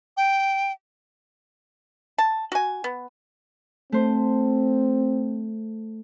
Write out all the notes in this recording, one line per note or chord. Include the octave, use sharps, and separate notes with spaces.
G5
A5
F#4 G#5
B3
A3 C4 C5